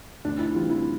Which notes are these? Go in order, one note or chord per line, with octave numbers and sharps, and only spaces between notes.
D2 D4
E4
C3 E3 G3 F4
E4